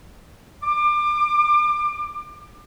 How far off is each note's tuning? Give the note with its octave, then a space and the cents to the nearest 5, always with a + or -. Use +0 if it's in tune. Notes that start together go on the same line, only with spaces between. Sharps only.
D6 +30